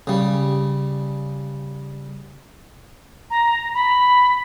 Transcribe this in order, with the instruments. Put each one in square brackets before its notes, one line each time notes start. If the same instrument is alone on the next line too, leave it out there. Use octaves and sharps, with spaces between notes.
[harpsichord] C#3 G3
[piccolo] A#5
B5